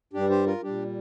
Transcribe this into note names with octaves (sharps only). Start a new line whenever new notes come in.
G2 G3 D4 G4
G4 C5
F4 A#4
A#2 G3 D4 G4